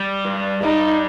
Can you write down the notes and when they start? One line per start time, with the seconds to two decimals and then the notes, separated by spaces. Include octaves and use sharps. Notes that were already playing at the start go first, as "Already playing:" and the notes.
Already playing: G3
0.25 G2
0.63 G3 D#4